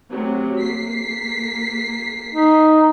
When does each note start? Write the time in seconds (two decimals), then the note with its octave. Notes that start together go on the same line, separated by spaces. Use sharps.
0.11 C3 F#3 A3
0.62 A#3 B6 C7
2.34 D#4